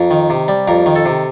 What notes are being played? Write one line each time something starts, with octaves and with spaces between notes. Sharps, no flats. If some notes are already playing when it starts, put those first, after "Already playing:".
Already playing: F2 A#4
D#3
C3
G3
F2 A#4
D#3
A4
C3